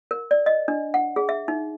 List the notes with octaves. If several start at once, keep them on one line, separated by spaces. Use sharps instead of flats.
A#4
D5
D#5
D4
F#5
G#4
E5
D#4